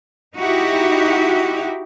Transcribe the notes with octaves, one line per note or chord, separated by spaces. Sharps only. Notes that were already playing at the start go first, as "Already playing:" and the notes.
D#4 E4 F#4 G4